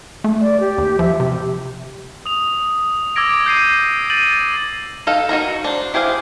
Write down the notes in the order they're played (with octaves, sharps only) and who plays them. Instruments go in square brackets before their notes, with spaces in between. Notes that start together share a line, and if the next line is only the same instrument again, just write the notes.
[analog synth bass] A3
[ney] D5
G4
[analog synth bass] D#2
[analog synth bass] F3 [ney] E5
[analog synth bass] C3 [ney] G4
[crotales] D#6 F7
D6 E6 G#6 A#6 D7
G6 C7 D#7
G6 A6 D#7 F#7
[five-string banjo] D#4 A4 F5
D#4 F#4 A#4 A#5
D4 C5
E4 G4 G#4 C5 F5